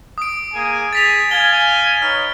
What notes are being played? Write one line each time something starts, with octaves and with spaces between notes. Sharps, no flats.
D#6 D7
A#3 G#4 G#5
G#4 A6 B6 F7
F5 G#5 G#6 G7
D#4 B4 C#5 F6